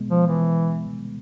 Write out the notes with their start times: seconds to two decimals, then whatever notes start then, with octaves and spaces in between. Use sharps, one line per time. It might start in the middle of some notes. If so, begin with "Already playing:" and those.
Already playing: B2 G#3 B3
0.10 F3
0.26 E3